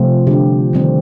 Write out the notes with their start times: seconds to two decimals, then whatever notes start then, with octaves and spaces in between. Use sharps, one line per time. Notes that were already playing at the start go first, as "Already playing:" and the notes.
Already playing: C3 F3 A3 C4 F4
0.27 D3 G3 D4 G4
0.73 D#3 G3 C4